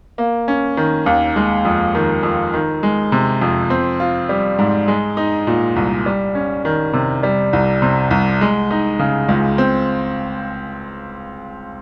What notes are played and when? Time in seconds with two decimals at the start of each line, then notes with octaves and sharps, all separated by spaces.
0.18 A#3
0.48 C#4
0.77 D#3
1.06 D#2
1.36 G#3
1.65 F2
1.95 D#3
2.23 F2
2.54 D#3
2.83 G#3
3.12 C3
3.41 F2
3.70 C4
4.00 F4
4.29 G3
4.59 G#2
4.88 G#3
5.17 D#4
5.47 A#2
5.76 C2
6.06 G3
6.35 C#4
6.65 D#3
6.93 C3
7.23 G3
7.53 C2
7.82 C3
8.11 C2
8.41 G#3
8.71 D#4
8.99 C#3
9.29 C#2
9.58 C4